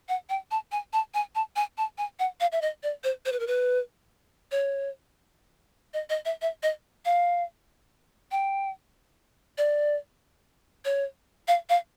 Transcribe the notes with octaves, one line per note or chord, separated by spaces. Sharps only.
F#5
G5
A5
G#5
A5
G#5
A5
G#5
A5
G#5
F#5
F5
E5
D#5
D5
C5
C5
B4
A#4
B4
C#5
D#5
D#5
E5
E5
D#5
F5
G5
D5
C#5
F5
F5